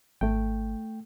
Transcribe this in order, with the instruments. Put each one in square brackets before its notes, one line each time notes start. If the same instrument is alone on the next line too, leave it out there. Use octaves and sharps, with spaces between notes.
[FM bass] G#1 [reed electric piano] A3 G5